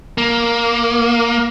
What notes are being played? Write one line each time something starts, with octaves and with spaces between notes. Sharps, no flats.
A#3